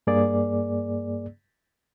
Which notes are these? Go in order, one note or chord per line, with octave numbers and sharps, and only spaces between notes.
G2 A#3 G#4 D5